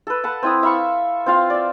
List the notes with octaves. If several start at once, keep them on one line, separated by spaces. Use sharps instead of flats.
A4 B4
B4 F#5 A5
C4 E4 D#6
E5 F5 B5 C#6
C4 F4 F5
D5 E5